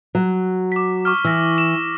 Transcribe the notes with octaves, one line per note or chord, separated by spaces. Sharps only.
F#3
D6 B6
C#6 D6 F6
E3 E6 A#6
E7